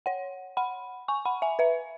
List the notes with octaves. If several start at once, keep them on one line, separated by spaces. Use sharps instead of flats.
C#5 F#5
F#5 B5
G#5 C#6
F#5 B5
E5 G#5
B4 E5